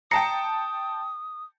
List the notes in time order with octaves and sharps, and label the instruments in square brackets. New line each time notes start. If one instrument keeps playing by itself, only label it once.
[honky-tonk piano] G5 A5 C#7 [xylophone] A#5 A#6 C7 [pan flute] D#6